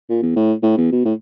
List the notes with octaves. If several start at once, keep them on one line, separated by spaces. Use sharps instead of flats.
A#2
E2
A2
A2
E2
B2
A2